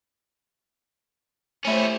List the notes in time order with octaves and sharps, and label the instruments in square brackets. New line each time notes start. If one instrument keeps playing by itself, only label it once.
[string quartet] A3 G4 C5 [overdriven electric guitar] C#4 E4